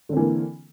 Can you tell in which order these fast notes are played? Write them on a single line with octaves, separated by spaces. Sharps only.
D3 C4 E3 A#3